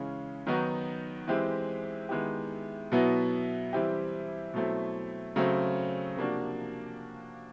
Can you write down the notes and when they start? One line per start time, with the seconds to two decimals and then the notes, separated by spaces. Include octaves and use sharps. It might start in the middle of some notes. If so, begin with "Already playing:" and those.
Already playing: C#3 E3 G#3 C#4
0.47 D#3 F#3 B3 D#4 F#4
1.28 E3 G#3 C4 E4 G4
2.09 D#3 G#3 B3 E4 G4
2.92 B2 F#3 B3 E4
3.73 E3 G3 C4 E4 G4
4.54 B2 F#3 A3 C4 E4
5.36 C#3 F#3 A3 C4
6.17 C3 F3 A#3 D4 F#4